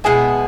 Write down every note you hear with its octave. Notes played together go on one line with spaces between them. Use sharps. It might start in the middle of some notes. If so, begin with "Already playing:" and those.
B2 G#3 B3 E4 G#4